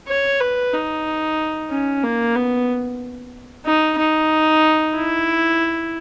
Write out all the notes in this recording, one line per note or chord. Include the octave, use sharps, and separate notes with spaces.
C#5
B4
D#4
C#4
A#3
B3
D#4
D#4
E4